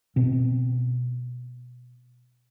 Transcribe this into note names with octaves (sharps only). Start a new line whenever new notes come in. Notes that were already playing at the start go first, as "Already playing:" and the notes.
B2 C4